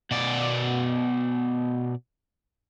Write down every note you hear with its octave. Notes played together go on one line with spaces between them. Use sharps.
B2 D5